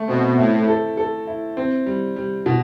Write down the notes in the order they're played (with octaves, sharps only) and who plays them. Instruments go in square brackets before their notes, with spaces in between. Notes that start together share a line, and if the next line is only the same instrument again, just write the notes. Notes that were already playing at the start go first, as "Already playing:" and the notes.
Already playing: [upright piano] A3
[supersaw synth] B2 [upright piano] C4
[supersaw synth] A2 [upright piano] E4
[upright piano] A4
A4
E4
C4
G3
G3
B2